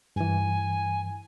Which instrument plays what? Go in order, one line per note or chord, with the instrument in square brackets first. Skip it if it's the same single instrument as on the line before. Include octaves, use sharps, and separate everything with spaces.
[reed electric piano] G2 E3 [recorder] G#5